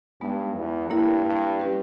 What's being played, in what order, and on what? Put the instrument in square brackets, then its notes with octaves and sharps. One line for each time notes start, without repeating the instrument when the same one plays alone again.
[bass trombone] G2 [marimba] G#3 B3 D#4
[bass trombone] E2
[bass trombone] G2 [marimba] A#3 E4 A#4
[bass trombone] G2
[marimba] G3 C#4 G4 B4